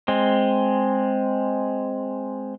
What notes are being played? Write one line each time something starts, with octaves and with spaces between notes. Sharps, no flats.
G#3 C4